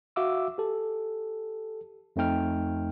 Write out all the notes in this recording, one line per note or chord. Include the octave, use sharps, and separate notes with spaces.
F#4 E5 F5 D6 E6
G4 A4
F2 A3 C4 D#4 G5 F6